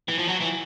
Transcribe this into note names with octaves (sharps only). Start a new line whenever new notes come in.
E3
F3
F#3
E3